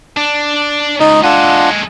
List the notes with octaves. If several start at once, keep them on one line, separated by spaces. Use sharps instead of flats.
D4
C#2 D#4 D#5
G#3 D4 F4 A4 F#5